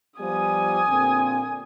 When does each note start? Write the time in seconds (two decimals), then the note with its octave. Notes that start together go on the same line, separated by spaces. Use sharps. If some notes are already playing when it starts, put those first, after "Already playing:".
0.20 F3 G3 B3 G#5 D#6
0.88 A#2 D3 C4